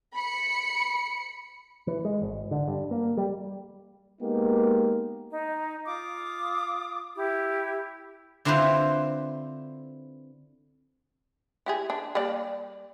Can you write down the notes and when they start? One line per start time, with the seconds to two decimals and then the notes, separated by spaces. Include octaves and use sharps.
0.13 B5 C#7
1.87 E3
2.05 G#3
2.22 G#1
2.51 D3
2.68 G2
2.91 A#3
3.17 G3
4.22 G#3 A#3 B3 D#4 G4 A#4
5.30 D#4
5.85 F4 D6 D#6
7.16 E4 G4
8.45 D3 C4 E4 F4 B4 C5
11.66 E4 G4 G#4
11.90 D4
12.15 G3 A#3 D5